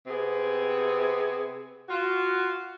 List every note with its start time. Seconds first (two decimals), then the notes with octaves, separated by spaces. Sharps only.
0.07 C3 B3 C4 G#4
1.89 F4 F#4